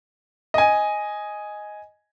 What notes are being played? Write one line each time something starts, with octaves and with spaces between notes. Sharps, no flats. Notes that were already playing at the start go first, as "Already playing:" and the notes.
D#5 G#5